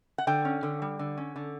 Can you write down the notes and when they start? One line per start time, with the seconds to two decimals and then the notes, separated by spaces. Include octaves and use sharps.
0.18 F#5
0.27 D3 G5
0.45 C#4
0.63 D3
0.82 G3
0.99 D3
1.17 C#4
1.36 D3